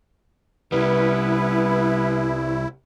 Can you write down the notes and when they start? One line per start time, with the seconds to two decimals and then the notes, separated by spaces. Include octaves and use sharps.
0.72 C2 G3 B3 C#4 E4 B4